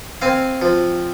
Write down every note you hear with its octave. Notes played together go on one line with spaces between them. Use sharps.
C4 F5 G#5
F3